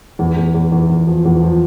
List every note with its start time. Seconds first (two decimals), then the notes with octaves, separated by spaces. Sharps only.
0.19 E2
0.37 E2
0.54 E2
0.72 E2
0.89 E2
1.07 F3
1.25 E2
1.43 F3